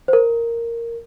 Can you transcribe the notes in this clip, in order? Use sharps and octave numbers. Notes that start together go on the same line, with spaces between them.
C5
A#4